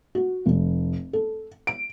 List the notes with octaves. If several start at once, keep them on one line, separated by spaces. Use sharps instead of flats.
F#4
F1
A4
D7